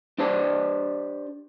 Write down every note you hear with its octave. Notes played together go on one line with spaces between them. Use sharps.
D4 G4 C5 D5 A5